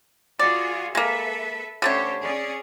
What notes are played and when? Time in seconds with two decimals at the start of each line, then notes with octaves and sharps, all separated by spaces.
0.39 F4 F#4 G#4 D5
0.95 G#3 A#3 A4 B4 E5
1.82 D3 A3 C#4 G4 C5 C#5
2.21 C#4 G#4 D5